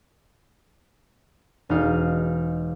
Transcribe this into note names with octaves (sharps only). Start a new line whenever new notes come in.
E1 D#4 F5